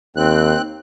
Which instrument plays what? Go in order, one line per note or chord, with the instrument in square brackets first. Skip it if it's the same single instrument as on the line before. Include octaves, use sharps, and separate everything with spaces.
[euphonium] D#2 [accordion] C4 F#6